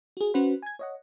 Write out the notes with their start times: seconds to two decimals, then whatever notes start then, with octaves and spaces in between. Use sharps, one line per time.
0.17 F#4 G#4
0.34 C#4 F#4 B4 C5 F#5 B5
0.62 G#5 G#6
0.79 C#5 D#5 F#5